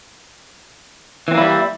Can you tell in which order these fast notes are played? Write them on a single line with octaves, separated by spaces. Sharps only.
E3 C4 A#3 E4 G3